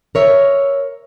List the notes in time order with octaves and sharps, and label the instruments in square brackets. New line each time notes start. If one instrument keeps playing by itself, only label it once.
[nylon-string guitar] A#4 C#5 E5